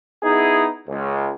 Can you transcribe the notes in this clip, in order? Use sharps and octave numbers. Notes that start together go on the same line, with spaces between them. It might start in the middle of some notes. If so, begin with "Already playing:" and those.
B3 D#4 E4 G#4
C#2